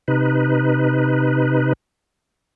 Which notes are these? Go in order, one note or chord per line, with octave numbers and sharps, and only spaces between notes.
C3 D#4 B4